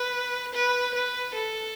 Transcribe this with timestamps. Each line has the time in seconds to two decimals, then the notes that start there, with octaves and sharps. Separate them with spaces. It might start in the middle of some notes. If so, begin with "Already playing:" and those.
Already playing: B4
0.54 B4
0.93 B4
1.33 A4